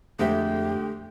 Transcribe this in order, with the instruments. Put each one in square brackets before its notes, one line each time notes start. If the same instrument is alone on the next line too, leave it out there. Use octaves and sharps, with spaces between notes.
[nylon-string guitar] F2 C5 E5 [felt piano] D3 G#3 [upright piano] A3 [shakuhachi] G4